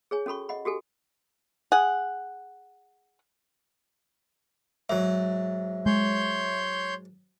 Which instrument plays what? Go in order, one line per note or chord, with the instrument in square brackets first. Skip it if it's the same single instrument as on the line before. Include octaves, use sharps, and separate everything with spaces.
[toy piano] G#4 C#5 G#5
C#4 F#4 A4 B5 C#6
D#5 F#5 B5
F#4 G4 A4 G#5
[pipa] G#4 F#5
[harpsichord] G#2 F#3 [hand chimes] E5
[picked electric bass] G#3 [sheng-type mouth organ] C#5 C6 G6